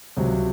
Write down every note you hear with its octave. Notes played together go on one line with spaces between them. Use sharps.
C#2 C3 F#3